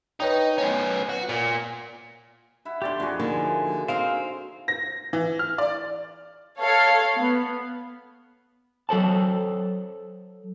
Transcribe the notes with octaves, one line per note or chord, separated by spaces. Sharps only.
D#4 B4 C#5 G5
B3 C#4
F#4
A#2
E4 E5 F#5
D3 G4 D5 C6 C#6
F2 F#4 G#4
D3 F3 A#3 D#4 G#5
C4 D#4 A#4 C5 F5
A#6
E3
F6
D5
A4 C#5 F5
B3
F#3 A4 C5 A5